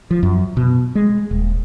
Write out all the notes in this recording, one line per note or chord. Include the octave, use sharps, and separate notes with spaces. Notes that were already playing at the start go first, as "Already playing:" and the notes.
F3
F#2
B2
G#3
D#1